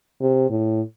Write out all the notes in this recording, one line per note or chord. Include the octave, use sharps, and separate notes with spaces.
C3
A2